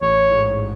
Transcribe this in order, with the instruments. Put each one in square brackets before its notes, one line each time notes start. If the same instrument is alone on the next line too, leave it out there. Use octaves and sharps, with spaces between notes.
[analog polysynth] A1 [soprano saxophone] C#5
[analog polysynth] G#2